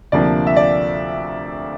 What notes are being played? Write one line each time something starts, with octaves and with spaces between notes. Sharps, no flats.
D2 C3 F3 A#3 D4 D5
E5
D5